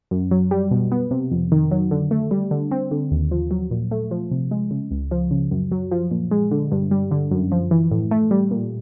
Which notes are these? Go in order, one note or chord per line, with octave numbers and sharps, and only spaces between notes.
F#2
F#3
G3
B2
B3
C3
F2
D#3
F#3
D3
A3
G3
D3
C4
D3
D#2
F3
F#3
A#2
A3
F3
C3
G#3
C#3
C#2
F3
C#3
F#2
F#3
F3
A#2
G#3
D3
G2
G3
D3
F#2
F3
E3
A2
A3
G3
A#2